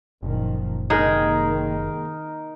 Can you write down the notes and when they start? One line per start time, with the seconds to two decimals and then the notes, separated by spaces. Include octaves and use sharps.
0.23 F#1 A#2 D#3 F3
0.90 C3 D#3 G#3 A#3 D#4 A#4